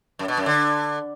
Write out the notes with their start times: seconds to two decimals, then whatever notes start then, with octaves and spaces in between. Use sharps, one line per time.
0.19 F#2
0.28 B2
0.37 F#2
0.46 D3